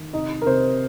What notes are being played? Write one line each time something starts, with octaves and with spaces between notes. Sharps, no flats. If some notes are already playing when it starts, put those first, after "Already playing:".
Already playing: D#3
C3 D#4
A#4
C3 C5